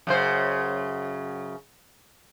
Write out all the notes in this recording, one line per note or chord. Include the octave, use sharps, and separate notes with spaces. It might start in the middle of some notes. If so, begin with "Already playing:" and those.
F#2 C#3 C5